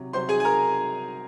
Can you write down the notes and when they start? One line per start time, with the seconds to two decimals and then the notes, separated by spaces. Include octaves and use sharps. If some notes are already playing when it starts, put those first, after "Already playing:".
Already playing: C3 F#3
0.13 C3 F#3 C5 C6
0.29 G#4 G#5
0.40 G#5
0.44 A#4 A#5